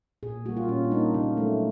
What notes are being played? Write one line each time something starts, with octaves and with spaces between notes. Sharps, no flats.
A#2 G#4
G3 A#3 F#4
F4
A#2 C#4
D4
G3 A#3 D#4
C#3 D#4
F#3 A3